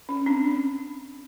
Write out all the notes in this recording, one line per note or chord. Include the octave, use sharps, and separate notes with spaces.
C#4
C4 D4
C#4